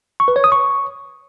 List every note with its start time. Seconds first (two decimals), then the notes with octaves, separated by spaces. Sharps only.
0.20 C#6
0.28 B4
0.36 C#5
0.44 D#6
0.52 C#6